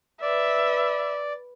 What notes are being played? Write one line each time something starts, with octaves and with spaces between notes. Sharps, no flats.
B4 D5 E5